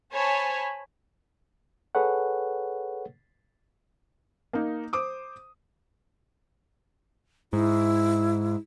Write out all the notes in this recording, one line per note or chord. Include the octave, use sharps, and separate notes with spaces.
C5 C#5 G#5 A5 B5
G#4 A4 B4 C#5 F#5
A#3 D#4
C5 D6 D#6
G#2 E4